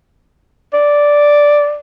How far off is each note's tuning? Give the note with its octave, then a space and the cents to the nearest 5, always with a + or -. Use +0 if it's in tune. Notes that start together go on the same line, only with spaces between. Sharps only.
D5 -5